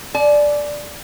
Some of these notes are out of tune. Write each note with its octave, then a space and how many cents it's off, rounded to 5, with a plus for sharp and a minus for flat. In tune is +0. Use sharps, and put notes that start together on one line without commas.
D5 +0 G#5 +45